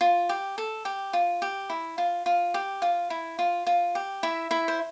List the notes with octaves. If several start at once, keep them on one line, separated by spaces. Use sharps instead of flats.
F4
G4
A4
G4
F4
G4
E4
F4
F4
G4
F4
E4
F4
F4
G4
E4 E5
E4 E5
C5